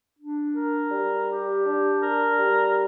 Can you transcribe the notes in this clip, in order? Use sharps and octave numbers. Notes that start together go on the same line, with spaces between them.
D4
A#4
G3
G4
D4
A#4
G3